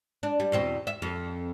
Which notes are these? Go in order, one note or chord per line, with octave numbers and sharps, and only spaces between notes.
D4
G3
E2 B2 C4
E5
F2